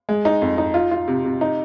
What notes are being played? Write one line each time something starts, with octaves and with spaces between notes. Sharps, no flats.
G#3
D#4
F2
D#4
F4
F4
C3
C3
D#4